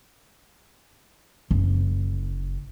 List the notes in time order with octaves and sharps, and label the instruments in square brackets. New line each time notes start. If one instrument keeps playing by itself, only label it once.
[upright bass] F#1